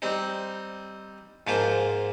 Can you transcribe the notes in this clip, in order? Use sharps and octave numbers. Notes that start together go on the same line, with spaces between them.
G3 C4 D#4
G#2 F3 A#3 F4 C5